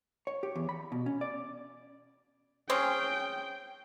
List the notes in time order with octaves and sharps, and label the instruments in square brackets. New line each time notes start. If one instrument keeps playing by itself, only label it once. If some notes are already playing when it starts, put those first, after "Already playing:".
[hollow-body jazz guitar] C#5
G4
E2
B5
B2
C#4
D5
[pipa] C4 C#4 G#4 [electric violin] G5